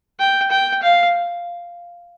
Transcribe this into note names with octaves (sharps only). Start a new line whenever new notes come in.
G5
G5
F5